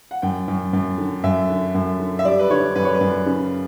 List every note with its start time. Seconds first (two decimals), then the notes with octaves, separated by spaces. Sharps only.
0.11 F#5
0.22 F#2 G5
0.48 F#2
0.73 F#2
0.98 D3
1.24 F#2 E5
1.49 D3
1.75 F#2
2.00 D3
2.19 E5
2.25 G3 D5
2.39 B4
2.50 D3 C#5
2.75 F#2 B4
2.85 C#5
2.95 B4
3.01 F#2
3.26 C#3